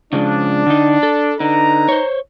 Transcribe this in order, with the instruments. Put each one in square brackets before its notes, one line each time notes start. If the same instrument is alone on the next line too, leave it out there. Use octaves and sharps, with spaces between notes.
[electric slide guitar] C#3 F3 G#3 [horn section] D4
[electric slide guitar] D3 D#4
A4
[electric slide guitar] D3 [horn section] D#4 B4 A#5
[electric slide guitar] C5 C#5